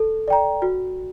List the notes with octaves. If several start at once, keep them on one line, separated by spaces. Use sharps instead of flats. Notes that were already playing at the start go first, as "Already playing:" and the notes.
Already playing: A4
D5 G5 A#5
F#4